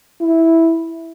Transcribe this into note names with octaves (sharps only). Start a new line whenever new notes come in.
E4